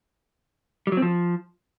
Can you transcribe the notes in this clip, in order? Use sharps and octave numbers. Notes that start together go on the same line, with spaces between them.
G3
F#3
C4
F3